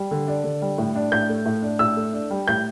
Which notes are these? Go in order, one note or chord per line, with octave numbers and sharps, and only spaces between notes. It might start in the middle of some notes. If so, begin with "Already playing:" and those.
Already playing: G3
D3
D4
D3
G3
A2
D4
A2 G6
A3
A2
D4
A2 E6
A3
D4
G3
A2 G6